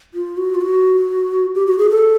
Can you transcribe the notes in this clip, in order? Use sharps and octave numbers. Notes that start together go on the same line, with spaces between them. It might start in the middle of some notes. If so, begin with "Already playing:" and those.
F4
F#4
F4
F#4
G4
F#4
G#4
A4